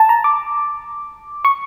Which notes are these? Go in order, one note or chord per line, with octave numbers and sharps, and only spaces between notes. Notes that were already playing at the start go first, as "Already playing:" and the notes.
Already playing: A5
A#5
D6
C#6